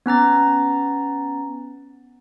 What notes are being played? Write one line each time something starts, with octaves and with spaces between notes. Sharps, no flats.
B3 C#4 A#5 A6